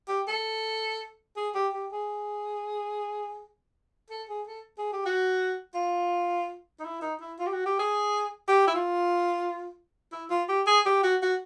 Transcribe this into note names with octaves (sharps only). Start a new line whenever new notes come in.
G4
A4
G#4
G4
G4
G#4
A4
G#4
A4
G#4
G4
F#4
F4
D#4
E4
D#4
E4
F4
G4
F#4
G4
G#4
G4
E4
F4
E4
F4
G4
G#4
G4
F#4
F#4